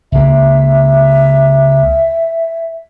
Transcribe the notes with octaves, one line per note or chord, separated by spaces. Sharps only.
C#2 A#3 E5